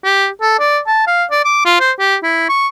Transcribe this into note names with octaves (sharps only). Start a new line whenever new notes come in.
G4
A4
D5
A5
F5
D5
D6
F4
C5
G4
E4
C#6